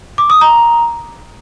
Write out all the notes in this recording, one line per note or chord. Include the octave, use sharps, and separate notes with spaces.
D6
D#6
A#5